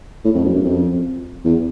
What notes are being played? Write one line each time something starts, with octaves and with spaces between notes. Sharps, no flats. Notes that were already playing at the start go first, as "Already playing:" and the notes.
A2
F2
F#2
F#2
F2
E2